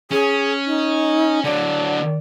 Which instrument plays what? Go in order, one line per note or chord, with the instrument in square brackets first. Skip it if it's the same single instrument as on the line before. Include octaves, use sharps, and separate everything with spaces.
[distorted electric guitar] C#4 [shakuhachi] G#4
[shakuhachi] D#4
[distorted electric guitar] D3 F#3 [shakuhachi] D5